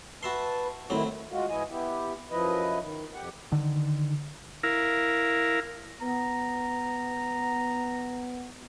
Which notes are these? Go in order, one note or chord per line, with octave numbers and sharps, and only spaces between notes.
F#4 B4 E5 A5 C6
A2 D#3 F#3 C4 E4
G#3 F4 F#4
G#2 E3 E4 D#5 G#5
B3 E4 G4
F#2 F3 E4 B4 D#5
D#3
F2 G4 F#5
D3 D#3
E4 A#4 F5
B3 A#5